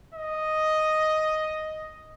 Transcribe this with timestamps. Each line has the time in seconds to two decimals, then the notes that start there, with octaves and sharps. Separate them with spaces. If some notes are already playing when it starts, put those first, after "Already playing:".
0.15 D#5